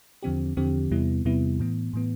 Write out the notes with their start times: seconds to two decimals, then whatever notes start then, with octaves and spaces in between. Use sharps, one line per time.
0.23 E2 D3 F3 C4 G4
0.57 E2 D3 F3 C4 G4
0.91 E2 C3 G3 B3 E4
1.25 E2 C3 G3 B3 E4
1.59 A2 E3 B3
1.93 A2 E3 B3